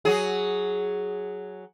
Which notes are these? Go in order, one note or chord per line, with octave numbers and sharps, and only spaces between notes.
F#3 G#4